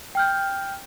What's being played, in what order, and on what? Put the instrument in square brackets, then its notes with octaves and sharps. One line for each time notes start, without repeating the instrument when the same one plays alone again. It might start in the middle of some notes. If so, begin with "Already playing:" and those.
[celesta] G5 F6 G6